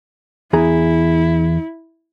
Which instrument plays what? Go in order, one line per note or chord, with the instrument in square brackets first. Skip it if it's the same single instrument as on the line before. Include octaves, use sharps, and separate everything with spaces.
[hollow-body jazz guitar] E2 G#4 A#5 [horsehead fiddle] E4